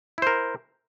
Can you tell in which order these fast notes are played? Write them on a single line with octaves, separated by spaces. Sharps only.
E4 C5 A#4